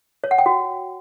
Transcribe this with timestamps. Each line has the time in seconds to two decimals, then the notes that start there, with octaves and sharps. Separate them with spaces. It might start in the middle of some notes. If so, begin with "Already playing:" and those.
0.24 C#5
0.31 F#5
0.38 G5
0.46 F#4